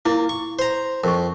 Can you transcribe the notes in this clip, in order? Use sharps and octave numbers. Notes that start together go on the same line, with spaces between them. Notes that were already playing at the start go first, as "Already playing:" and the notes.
A#3 E4
C#6
C5 A#5
F2 A#4 C#6